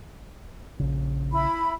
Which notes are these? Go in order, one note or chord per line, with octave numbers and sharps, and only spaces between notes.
A#1 C#3
E4 B5